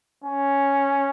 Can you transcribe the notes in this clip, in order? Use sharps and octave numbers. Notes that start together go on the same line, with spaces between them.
C#4